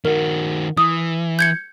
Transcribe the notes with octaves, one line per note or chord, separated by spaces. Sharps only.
D#3 F#4 A#4
E3 D#6
G6 G#6 C#7